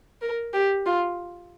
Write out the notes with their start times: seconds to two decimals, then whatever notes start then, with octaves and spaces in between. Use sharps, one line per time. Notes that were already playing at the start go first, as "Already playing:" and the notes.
0.22 A#4
0.54 G4
0.86 F4